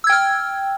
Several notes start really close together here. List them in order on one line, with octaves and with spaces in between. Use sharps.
E6 G#6 G5 F6